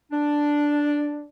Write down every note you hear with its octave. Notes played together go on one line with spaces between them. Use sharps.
D4